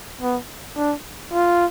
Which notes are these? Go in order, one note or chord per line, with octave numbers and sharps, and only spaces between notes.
B3
D4
F4